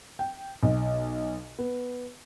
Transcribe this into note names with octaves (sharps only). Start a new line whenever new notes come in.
G5
B1
B3